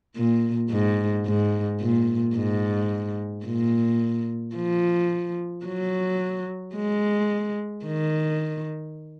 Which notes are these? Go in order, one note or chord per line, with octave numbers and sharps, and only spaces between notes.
A#2
G#2
G#2
A#2
G#2
A#2
F3
F#3
G#3
D#3